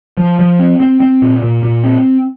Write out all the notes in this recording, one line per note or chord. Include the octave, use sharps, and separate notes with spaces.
F3
F3
C4
C4
C4
A#2
A#2
A#2
C4